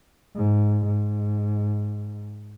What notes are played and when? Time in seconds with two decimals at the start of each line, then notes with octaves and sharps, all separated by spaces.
0.36 G#2
0.86 G#2